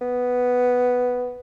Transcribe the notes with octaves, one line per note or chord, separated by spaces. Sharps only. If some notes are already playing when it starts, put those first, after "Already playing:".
B3